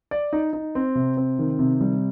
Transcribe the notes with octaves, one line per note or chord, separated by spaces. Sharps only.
D5
D#4
D#4
C4
C3
C4
D#3
C3
G3